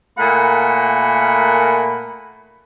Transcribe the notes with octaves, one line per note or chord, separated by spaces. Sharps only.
A#2 A3 A#4 F#5 G#5 B5